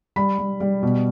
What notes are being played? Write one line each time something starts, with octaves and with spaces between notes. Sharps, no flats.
G3 B5
G3
G3
B2